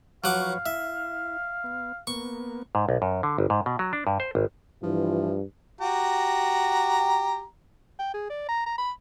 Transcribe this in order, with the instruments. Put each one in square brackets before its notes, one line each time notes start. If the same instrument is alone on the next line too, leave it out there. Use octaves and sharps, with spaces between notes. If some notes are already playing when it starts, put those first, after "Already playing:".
[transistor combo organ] F3 B4 C#5 [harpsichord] F#3 F#5 D6 [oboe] F5
[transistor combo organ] E4 [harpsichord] E5
[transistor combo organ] B3
[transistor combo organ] A#3 B3 [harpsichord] C#6
[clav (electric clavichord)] G#2
B1
F#2
D3
G1
G#2
B2
F#3
D4
G2
C5
G#1
[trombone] G2 [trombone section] E3 E4 [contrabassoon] F3 [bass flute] F4
[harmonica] F#4 G4 A#5
[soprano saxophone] G5
G#4
D5
A#5
A#5
B5